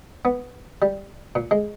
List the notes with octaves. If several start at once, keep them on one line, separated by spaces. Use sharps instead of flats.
B3
G3
A#2
G#3